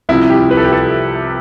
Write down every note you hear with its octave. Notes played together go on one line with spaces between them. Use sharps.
C2 C3 F3 E4
G4
B4
A4
G4
A4